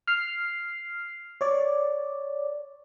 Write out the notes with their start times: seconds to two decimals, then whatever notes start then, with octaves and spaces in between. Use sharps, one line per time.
0.07 F6 C7
1.41 C#5 D5